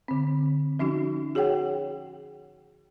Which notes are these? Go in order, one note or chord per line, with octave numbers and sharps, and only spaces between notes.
D3 C4
F3 C#4 D#4 F#4
F#4 G#4 C#5 F#5 G5